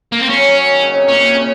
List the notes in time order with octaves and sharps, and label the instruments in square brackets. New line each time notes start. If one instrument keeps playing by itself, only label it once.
[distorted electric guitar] A#3
C4
[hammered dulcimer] F#3 [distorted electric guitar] C#4
[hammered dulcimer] F#3
D#3
C#3
C3
[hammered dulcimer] A#2 [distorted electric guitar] C#4
[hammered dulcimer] C3
C#3